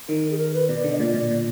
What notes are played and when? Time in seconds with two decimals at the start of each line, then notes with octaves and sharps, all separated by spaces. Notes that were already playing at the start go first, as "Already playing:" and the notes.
0.09 D#3 A#4
0.31 G#4
0.38 A#4
0.54 B4
0.69 B2 D5
0.84 D3
0.92 D#5
0.99 A#2 D5
1.14 A#2
1.30 A#2